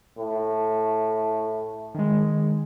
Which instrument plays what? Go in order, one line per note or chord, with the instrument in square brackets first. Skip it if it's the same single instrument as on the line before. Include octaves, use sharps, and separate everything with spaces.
[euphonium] A2
[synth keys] D#3 G#3